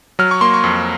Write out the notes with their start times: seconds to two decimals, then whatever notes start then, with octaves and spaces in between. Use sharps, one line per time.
0.19 F#3 F6
0.31 C#6
0.41 A#3 C6
0.53 C#6
0.64 F2